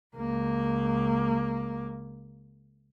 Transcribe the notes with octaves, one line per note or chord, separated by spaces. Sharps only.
C#2 A#3